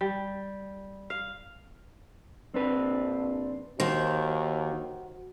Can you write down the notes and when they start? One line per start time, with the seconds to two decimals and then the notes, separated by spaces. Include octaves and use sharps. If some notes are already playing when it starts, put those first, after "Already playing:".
0.01 G3
1.10 F5
2.54 A#1 C4 D4 B4
3.80 D#2 D#3 F#4 C5